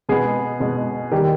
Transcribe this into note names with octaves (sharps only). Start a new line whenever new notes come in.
B2 G#3 B3 G#4
B2 G#3 B3
D#3 G3 A#3 G4